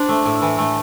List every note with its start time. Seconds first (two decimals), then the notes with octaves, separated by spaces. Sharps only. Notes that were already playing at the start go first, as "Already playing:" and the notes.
Already playing: D4 C5
0.09 A3
0.25 A2
0.42 E3
0.58 A3